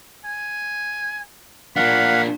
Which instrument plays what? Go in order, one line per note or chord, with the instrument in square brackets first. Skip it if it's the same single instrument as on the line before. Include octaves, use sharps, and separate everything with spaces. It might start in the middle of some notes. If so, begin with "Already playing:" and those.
[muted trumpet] G#5
[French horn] A#2 [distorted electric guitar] A#3 D4 [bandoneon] F5 F#5 [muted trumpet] B5